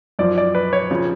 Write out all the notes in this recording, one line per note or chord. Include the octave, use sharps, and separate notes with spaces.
F#2 F3 D5
D5
B4
C#5
C#3 F3